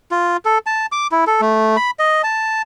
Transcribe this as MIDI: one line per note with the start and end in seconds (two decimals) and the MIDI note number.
0.11 0.37 65
0.45 0.58 69
0.66 0.86 81
0.92 1.07 86
1.12 1.25 64
1.27 1.41 69
1.41 1.77 57
1.77 1.91 83
1.99 2.22 75
2.23 2.62 81